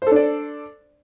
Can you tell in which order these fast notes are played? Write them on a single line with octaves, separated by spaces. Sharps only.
C5 A4 D4 D5